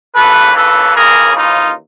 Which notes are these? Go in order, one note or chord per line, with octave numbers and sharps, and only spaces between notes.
D#2 C#3 E3 A4 B4
A4 B4
G#4 A#4
D#4 F4